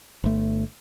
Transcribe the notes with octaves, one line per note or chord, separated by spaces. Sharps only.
G1 A3